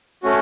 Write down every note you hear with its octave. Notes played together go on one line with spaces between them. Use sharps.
A3 C#4 F#4